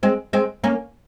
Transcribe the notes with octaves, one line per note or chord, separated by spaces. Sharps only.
G#3 C4
G#3 C4
A#3 C#4